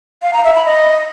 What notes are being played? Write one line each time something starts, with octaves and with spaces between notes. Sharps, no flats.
F5
A#5
E5
B5
D#5